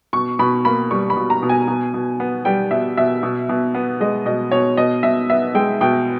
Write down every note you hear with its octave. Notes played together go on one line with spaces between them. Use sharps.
B2 C#6
B2 B5
A#3 B5
G3 C#6
B5
B2
A#5
B2
G#5
B2
B2
B3
G3 G5
B2 E5
B2 E5
B2
B2
B3
G#3 D#5
B2 D#5
B2 C#5
B2 D#5
B2 E5
B3 E5
G#3 G5
B2 G5